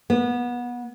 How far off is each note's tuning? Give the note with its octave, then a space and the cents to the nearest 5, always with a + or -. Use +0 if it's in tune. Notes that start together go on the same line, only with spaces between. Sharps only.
B3 -25